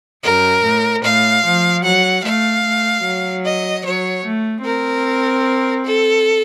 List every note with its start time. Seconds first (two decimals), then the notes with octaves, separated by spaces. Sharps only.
0.23 F#2 A#4
0.63 A2
1.03 A2 F5
1.44 F3
1.84 F#3 F#5
2.24 A3 F5
2.64 A3
3.04 F#3
3.45 D#5
3.85 F#3 C#5
4.26 A3
4.65 C4 A#4
5.85 A4